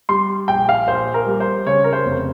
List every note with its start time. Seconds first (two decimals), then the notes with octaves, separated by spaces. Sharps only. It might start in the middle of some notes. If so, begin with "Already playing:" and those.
0.09 G3 C6
0.48 A#1 G5
0.69 F5
0.88 A#1 C5
1.14 A#4
1.26 G3
1.40 C5
1.67 C#3 C#5
1.84 A#4
1.93 C5
2.06 F1